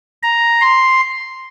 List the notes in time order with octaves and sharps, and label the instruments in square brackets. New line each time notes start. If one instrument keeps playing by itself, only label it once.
[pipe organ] A#5
C6